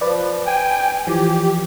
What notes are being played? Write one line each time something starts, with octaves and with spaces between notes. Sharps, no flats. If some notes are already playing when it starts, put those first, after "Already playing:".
F3 B4 D5
G5 G#5
E3 F3 G4